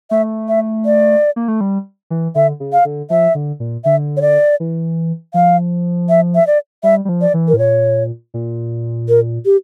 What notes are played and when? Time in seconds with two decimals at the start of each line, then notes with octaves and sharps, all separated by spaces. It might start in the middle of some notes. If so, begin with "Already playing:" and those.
0.11 A3 E5
0.48 E5
0.85 D5
1.36 A#3
1.48 A3
1.61 G3
2.10 E3
2.35 D3 E5
2.60 C#3
2.73 F5
2.85 D3
3.10 F3 E5
3.35 D3
3.60 A#2
3.84 D3 E5
4.17 C#5
4.22 D5
4.60 E3
5.34 F3 F5
6.09 E5
6.35 E5
6.47 D5
6.83 G3 E5
7.05 G3
7.09 F3
7.21 D5
7.34 E3
7.48 A#4
7.54 A2
7.58 A#2 C#5
8.34 A#2
9.09 A#4
9.45 G4